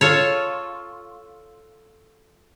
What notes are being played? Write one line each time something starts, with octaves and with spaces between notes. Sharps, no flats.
F4 A4 C#5